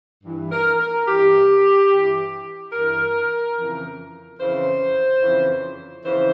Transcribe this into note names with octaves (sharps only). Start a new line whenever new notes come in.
G2 E3
A#4
A#4
G2 E3 G4
G2 E3
G2 E3 A#4
F2 C#3 E3
F2 C#3 E3 C5
F2 C#3 E3
F2 C#3 E3 C5